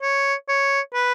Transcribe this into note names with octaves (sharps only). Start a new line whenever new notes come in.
C#5
C#5
B4